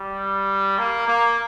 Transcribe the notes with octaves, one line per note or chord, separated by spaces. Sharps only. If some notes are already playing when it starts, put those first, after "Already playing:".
Already playing: G3
A#3
A#3